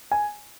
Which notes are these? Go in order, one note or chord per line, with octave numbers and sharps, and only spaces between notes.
G#5